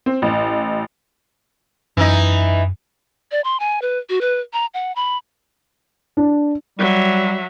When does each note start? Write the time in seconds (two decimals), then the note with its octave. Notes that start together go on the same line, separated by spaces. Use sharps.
0.06 C4
0.22 A1
1.97 F#2 E3 D#4
3.32 D5
3.44 C6
3.60 G#5
3.82 B4
4.09 F#4
4.21 B4
4.53 A#5
4.74 F#5
4.96 B5
6.17 D4
6.79 F#3 G3 E5